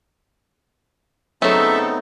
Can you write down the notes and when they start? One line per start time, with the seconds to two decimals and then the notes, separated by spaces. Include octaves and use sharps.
1.42 C#3 F#3 A3 B3 C4 D#4 A4 E5